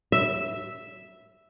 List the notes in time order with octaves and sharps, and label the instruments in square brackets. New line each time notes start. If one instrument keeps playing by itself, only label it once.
[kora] E5